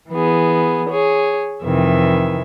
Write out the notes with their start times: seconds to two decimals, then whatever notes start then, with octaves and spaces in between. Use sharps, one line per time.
0.10 E3 B3 G#4
0.90 G#4 C#5
1.64 F2 C3 D#3 E3 E5